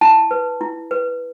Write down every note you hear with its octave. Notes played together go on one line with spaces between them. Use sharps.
E4 A5
B4
E4
B4